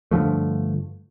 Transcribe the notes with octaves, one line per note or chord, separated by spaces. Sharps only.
G2 D3 F3 A3